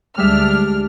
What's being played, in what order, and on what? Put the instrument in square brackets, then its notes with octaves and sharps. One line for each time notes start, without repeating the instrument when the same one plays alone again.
[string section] D2 D4 F6 [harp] G3 G#3 E5